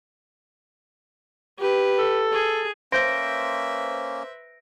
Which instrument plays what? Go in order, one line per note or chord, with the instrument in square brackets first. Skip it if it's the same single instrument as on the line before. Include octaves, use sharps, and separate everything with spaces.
[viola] G4 B4
[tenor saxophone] A4
[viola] G#4
[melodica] A#3 C#4 [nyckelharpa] B4 E5 [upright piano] C5 G6 [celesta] A#6 D7